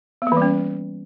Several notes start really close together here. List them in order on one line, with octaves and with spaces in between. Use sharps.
B3 A#3 E3 G3 C#4